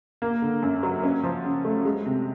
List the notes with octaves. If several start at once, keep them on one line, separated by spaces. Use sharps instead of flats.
A#3
D3
F#2
F#3
C#4
F3
C#3
A3
G#3
C3